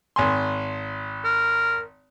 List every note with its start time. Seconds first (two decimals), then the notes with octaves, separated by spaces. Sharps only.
0.16 G#1 G#5 C6
1.25 A#4